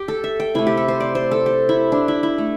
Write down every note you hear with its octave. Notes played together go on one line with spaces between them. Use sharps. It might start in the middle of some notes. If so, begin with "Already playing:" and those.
Already playing: G4 G5
A4
E5
G5
C3 A3 E4
G4
A4
C5
D5
C5
A4
G4
E4
D4
E4
E4
A3